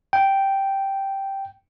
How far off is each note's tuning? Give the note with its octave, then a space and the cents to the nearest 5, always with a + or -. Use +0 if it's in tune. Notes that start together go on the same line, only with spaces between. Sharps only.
G5 -5